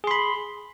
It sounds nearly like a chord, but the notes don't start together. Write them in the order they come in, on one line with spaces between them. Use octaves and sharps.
G#4 C6 B5